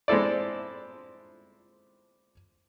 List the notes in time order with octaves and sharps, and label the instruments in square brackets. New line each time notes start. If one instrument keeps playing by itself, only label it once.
[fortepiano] G#3 C4 E4 A4 D5